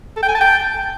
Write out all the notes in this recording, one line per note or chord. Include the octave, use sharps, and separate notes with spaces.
A4
G5
G#5
A5
G5